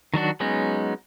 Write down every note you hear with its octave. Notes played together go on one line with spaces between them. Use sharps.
D#3 F#3 D4 F#4
F#3 G#3 B3 C#4 D#4